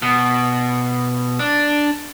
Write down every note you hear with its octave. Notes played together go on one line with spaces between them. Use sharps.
B2
D4